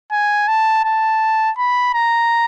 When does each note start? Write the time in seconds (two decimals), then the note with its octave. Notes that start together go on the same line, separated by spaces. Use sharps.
0.12 G#5
0.48 A5
0.85 A5
1.58 B5
1.94 A#5